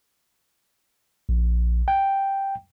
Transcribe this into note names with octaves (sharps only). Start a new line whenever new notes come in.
A#1
G5